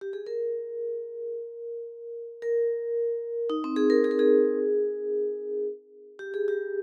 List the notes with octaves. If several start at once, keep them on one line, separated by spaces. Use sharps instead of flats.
G4
G#4
A#4
A#4
D#4
C4
G#4
A#4
G#4
A#4
G#4
G4
G#4
G4